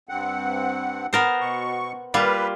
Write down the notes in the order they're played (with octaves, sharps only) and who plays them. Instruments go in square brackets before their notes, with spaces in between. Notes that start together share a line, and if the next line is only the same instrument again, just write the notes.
[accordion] G2 C4 F#5
[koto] B3 A#4 C5
[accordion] B2 C#6
[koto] G3 A#3 F4 [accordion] B4